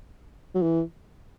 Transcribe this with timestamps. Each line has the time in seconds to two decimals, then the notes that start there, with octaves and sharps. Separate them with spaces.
0.55 F#3
0.62 E3